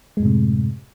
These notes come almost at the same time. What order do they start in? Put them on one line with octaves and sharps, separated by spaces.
G#3 F#2 A2 C3